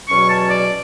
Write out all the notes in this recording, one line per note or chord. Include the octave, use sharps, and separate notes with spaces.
E2 B2 F#3 C#4 C#6
A5
D5